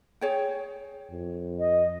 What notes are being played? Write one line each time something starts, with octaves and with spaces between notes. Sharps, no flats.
G#4 C#5 G5
F2
D#5